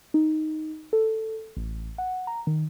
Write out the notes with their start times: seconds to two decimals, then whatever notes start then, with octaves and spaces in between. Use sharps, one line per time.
0.14 D#4
0.93 A4
1.57 A1
1.98 F#5
2.27 A#5
2.47 D#3